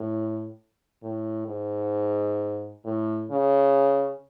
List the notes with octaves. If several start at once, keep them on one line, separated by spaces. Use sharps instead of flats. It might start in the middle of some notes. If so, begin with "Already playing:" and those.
Already playing: A2
A2
G#2
A2
C#3